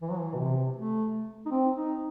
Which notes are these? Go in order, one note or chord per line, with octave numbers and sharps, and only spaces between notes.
E3
F#3
E3
B2
C3
A3
D#4
C4
D#4